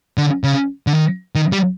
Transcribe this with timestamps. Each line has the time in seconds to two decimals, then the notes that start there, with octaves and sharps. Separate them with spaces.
0.18 D3
0.44 C#3
0.87 D3
0.93 D#3
1.35 D#3
1.52 G3